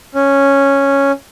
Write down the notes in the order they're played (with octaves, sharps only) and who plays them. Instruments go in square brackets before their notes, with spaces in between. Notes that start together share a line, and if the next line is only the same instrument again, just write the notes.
[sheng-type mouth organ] C#4